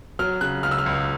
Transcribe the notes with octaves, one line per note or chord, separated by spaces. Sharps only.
F#3 F6
C#3 F#6
C#2 F6
E6
F6
C#2